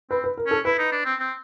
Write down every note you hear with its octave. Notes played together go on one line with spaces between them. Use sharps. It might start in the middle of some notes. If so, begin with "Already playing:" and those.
C4 B4
B4
A#4
C#4 A4
E4 B4
D#4
D4
C4
C4